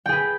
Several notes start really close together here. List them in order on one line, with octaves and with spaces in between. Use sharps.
G5 G#4 B4